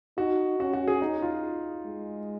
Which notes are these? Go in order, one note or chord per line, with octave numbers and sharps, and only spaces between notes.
D#4 F#4
C#4 F#4
F#4
G#4
D#4
F4
G#3